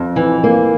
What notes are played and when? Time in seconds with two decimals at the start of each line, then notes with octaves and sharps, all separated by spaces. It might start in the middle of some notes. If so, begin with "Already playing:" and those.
Already playing: F2
0.16 E3
0.44 A#3